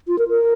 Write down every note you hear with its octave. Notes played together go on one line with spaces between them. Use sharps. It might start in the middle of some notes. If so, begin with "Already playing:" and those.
F4
A#4
A#4